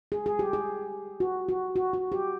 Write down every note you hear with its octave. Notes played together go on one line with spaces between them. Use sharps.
G#4
G#4
G4
G#4
F#4
F#4
F#4
F#4
G4